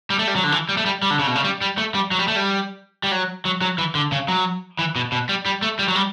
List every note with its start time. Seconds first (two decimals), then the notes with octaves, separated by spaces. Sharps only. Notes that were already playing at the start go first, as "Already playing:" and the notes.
0.10 G3
0.19 A3
0.27 G3
0.36 F#3
0.44 D3
0.52 E3
0.69 G3
0.77 A3
0.86 G3
1.02 G3
1.11 D3
1.19 C#3
1.27 B2
1.35 C#3
1.44 G3
1.61 G3
1.78 A3
1.94 G3
2.11 F#3
2.19 G3
2.28 A3
2.36 G3
3.03 G3
3.12 F#3
3.45 F#3
3.61 F#3
3.78 E3
3.95 D3
4.12 C#3
4.28 F#3
4.79 E3
4.96 B2
5.12 B2
5.29 G3
5.45 G3
5.62 A3
5.79 G3
5.88 F#3
5.96 G3